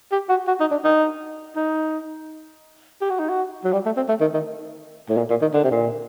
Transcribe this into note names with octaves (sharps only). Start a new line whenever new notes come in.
G4
F#4
F#4
D#4
D4
D#4
D#4
G4
F#4
D#4
F#4
F#3
G3
A3
C4
A3
D#3
D#3
A2
A#2
A#2
D#3
D3
C3
A#2